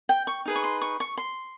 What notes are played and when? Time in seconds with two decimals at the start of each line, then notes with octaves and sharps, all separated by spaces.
0.09 G5
0.27 C#6
0.46 D#4 G#4 B4
0.55 C#6
0.64 C6
0.81 C#6
1.00 C#6
1.17 C6